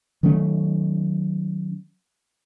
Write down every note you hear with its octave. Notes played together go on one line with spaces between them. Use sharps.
D#3 F#3 A3 C#4